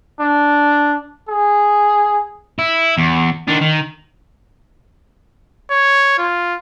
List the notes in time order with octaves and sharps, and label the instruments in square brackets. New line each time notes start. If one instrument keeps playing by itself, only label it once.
[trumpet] D4
G#4
[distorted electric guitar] E4
E2
D#3 D4
D#3
[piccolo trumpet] C#5
F4